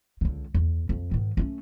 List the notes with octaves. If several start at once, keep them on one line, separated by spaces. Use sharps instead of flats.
C#2 D3
E2
F2
G#2 D#3
A3 C#4